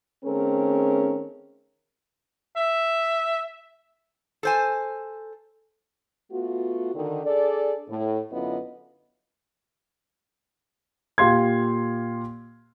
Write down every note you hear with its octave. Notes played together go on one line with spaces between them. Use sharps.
D#3 A3 C4 C#4 G#4 A#4
E5
A4 C5 G#5
A3 B3 F4 F#4
D3 D#3
D4 G#4 A4 D5
A2
F#2 D3 B3 E4 F4 D#5
A#2 G4 F5 C6 G#6